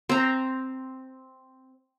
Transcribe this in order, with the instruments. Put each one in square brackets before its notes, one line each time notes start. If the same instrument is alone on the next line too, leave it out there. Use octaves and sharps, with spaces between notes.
[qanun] C4 A#5